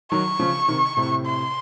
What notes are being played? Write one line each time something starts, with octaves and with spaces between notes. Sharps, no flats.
D#3 F#3 C#6
C#3 F3
C3 D#3
A2 C3
C6